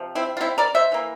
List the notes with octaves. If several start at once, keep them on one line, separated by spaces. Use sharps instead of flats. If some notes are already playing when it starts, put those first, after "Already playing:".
Already playing: C3 F3
C4 E4
F4
C4 E4
A#4 D5
C5 E5
E3 A#3